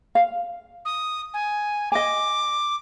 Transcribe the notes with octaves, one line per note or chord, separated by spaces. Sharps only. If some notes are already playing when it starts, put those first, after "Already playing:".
F5
D#6
G#5
D#5 G#5 D6